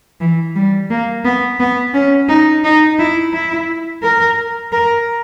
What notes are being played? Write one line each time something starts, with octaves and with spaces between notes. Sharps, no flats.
E3
G3
A#3
B3
B3
C#4
D#4
D#4
E4
E4
A#4
A#4